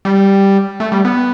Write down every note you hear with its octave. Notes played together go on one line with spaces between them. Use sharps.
G3
A3
G3
B3